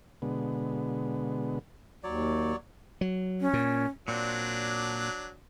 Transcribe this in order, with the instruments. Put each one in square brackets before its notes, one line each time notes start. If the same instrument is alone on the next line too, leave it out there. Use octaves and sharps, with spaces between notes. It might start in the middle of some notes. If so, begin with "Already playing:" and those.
[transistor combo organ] B2 D3 G#3 B3
[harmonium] D#2 [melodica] F#3 C#5 D5
[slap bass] F#3
[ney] C#4
[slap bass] A#2
[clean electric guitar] A#2 C4 [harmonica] F#3 D4